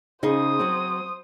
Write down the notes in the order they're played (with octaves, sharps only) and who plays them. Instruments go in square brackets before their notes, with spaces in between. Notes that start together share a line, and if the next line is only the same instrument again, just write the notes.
[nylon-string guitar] C#3 D#4 G#4 [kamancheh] C5 D#6
[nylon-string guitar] F#3 C4